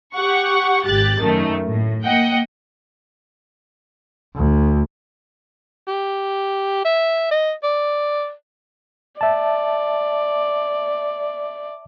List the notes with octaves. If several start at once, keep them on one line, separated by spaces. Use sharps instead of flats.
G4 F#5 C#6
G#1 G4 F#6 A6
F#2 D#3 A3
A2
A#3 D#5 F#5 G5
D2
G4
E5
D#5
D5
D5 E5 A5